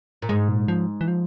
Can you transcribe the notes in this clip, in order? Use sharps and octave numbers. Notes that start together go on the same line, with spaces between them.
A#2
G#2 G#3
A#2
F3
E3
F3